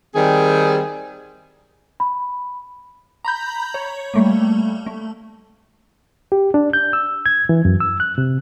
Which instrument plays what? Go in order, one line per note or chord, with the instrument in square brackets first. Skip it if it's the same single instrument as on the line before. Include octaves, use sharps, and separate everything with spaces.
[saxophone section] D#3 G3 C4 G#4
[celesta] B5
[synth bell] A#5 B5 G6
C#5
G3 A3 A#3
A3
[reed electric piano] G4
D4
G6
E6
G#6
E3
F#2
E6
F#6
C3